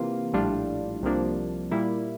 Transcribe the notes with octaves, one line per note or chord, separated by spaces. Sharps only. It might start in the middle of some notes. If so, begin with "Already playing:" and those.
Already playing: C3 E3 A#3 F4
A#1 A2 G3 D4 F4
C2 C3 F3 A#3 D4
A#2 G3 A#3 E4